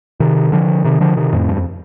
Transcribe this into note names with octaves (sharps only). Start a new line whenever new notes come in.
C3 D#3
D3 F3
C3 D#3
D3 F3
C3 D#3
F2 A2
G2
F2